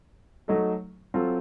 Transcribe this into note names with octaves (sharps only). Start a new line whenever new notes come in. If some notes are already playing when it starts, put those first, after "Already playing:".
F#3 A3 D#4 A4
F#3 C4 F4 A4